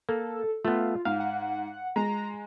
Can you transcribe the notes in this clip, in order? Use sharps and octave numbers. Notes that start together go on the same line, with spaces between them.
A#3 A4
A3 B3 F4
G#2 F5
F#5
G#3 A#5